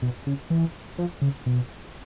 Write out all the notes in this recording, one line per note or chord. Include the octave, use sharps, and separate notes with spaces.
B2
C#3
E3
F3
C#3
B2